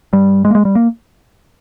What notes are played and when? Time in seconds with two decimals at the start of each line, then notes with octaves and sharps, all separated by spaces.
0.13 G2 G3
0.45 G#3
0.51 A#3
0.55 G#3
0.65 G3
0.75 A#3